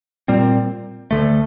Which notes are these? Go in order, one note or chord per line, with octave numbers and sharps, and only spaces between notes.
A#2 G3 C4
D2 D3 A3